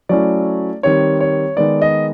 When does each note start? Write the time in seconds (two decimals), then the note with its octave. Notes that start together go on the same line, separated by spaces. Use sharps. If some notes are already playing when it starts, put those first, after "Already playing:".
0.09 F#3 A3 C#4 E4 D5
0.83 D#3 G3 C4 C#5
1.20 C#5
1.56 D#3 G#3 B3 D5
1.82 D#5